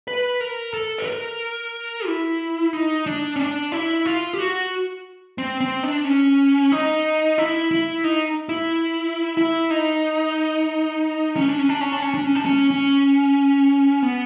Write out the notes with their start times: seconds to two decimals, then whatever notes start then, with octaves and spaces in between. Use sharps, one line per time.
0.08 B4
0.41 A#4
0.74 A4
0.98 B4
1.07 A#4
2.06 E4
2.73 D#4
3.06 D4
3.36 C#4
3.39 D4
3.72 E4
4.05 F4
4.33 G4
4.39 F#4
5.38 C4
5.61 C4
5.83 D4
6.05 C#4
6.72 D#4
7.38 E4
7.71 E4
8.04 D#4
8.49 E4
9.37 E4
9.70 D#4
11.36 C#4
11.48 D4
11.59 C#4
11.69 D4
11.81 C#4
11.92 D4
12.02 C#4
12.14 D4
12.24 C#4
12.35 D4
12.46 C#4
12.70 C#4
14.03 B3